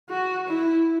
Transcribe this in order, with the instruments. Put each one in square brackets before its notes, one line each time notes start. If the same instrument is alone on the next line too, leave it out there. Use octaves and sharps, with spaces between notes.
[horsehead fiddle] F#4
E4